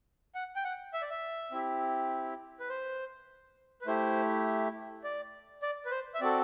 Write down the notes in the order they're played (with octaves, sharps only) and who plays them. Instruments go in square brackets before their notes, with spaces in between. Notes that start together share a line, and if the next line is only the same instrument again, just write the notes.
[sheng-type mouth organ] F#5
G5
F#5
E5
D5
E5
C4 E4 G4
B4
C5
B4
A3 E4 G4 C5
D5
D5
B4
C5
E5
C4 F#4 A4 D5